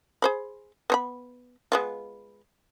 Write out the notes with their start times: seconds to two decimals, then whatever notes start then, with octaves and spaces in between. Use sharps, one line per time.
0.22 G#4 C5 B5
0.90 B3 C5 B5
1.72 G#3 B3 F4